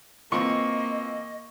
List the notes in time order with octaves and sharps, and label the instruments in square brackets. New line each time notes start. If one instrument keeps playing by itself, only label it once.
[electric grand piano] E3 C4 F4 [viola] A#3 [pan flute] D#5 [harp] C#6